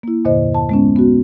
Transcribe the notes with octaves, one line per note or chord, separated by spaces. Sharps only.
A#3 E4
E2 G2 A#2 D3 C5 D#5
A5
G#3 B3 C#4
B3 F#4